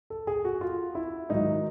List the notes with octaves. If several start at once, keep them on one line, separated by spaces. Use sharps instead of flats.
A4
G#4
F#4
F4
E4
G#2 D#3 F#3 D#4